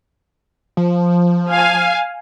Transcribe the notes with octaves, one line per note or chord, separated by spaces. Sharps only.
F3
F5 G#5